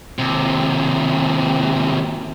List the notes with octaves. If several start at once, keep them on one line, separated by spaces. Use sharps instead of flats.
D#2 C3